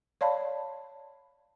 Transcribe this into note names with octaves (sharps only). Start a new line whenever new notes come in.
C#5 D5 F5 A5 B5